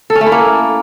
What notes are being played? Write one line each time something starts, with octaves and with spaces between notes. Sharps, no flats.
A4
C#4
A3
E4
A#3